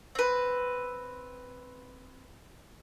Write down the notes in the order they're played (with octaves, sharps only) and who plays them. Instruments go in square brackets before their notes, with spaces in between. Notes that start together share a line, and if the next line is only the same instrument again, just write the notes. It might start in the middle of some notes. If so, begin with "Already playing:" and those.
[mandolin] C4 B4